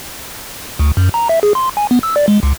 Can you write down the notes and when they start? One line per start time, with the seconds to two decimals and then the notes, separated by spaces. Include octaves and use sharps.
0.79 D2
0.97 F#2
1.14 A#5
1.29 E5
1.43 G#4
1.55 C6
1.77 G#5
1.91 B3
2.03 E6
2.16 D5
2.28 G#3
2.43 C#2